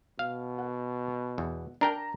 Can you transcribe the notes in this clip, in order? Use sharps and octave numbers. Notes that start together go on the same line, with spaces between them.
B2 F5
F#5
E2
D4 A#4 G5 A5 A#5